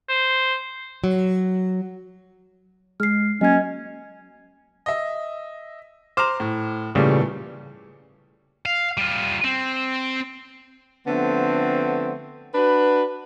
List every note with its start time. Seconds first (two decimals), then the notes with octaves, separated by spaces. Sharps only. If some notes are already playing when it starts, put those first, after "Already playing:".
0.09 C5
1.04 F#3
3.00 G#3 F6 C7
3.41 F#3 A#3 C#4 D#5 G#6
4.86 D#5 E5
6.17 C5 A#5 C6 D6 F6
6.40 A2
6.95 A#2 C#3 E3 G3 A3
8.65 F5
8.97 G3 F4
9.44 C4
11.07 D3 F3 A3 B3 C4
12.54 D4 F#4 B4